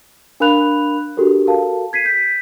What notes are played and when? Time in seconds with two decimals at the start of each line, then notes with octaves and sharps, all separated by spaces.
0.40 D4 A#4 F5 B5 F#6 F7
1.17 D4 F#4 G4 A4 A#4
1.47 F#4 A4 A#4 F5 A5
1.93 G#6 B6 C7 D#7
2.05 G6 B6